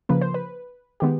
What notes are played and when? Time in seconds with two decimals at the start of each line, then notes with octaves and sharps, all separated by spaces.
0.09 C#3 F3 A#3 B4
0.21 C5
0.34 B4
1.00 D#3 G#3 B3 G4